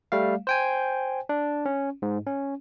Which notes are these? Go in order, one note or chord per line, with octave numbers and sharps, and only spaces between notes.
G3 A3 F5
C5 G5 G#5
D4
C#4
G#2
C#4